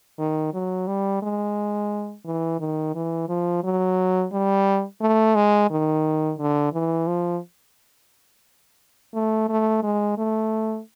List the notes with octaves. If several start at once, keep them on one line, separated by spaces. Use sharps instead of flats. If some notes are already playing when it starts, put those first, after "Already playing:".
D#3
F#3
G3
G#3
E3
D#3
E3
F3
F#3
G3
A3
G#3
D#3
D3
E3
F3
A3
A3
G#3
A3